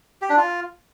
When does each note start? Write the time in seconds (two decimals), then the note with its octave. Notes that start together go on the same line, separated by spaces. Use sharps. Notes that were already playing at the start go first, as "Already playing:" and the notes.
0.22 G4
0.30 D4
0.37 F4